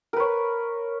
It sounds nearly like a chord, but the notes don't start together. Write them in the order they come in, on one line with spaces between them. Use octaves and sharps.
A#4 B4 C#5